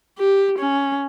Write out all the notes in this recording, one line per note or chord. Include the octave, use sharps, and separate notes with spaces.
G4
C#4